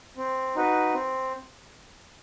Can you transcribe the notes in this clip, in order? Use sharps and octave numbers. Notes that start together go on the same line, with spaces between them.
C4
D#4 F#4 B4
C4